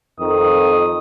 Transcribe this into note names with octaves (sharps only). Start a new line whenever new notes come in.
F2 D#3 D#6